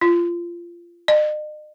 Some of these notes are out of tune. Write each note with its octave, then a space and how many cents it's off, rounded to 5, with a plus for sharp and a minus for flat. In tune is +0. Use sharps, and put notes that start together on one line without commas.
F4 -20
D#5 -45